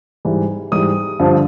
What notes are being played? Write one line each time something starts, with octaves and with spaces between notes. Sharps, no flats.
G#2 E3 G3
G#2 E3 G3 D#6
G2 D3 F3